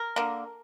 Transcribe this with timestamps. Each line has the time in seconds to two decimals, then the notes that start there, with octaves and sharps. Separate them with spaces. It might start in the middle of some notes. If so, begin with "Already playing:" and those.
Already playing: A#4
0.16 D3 A#3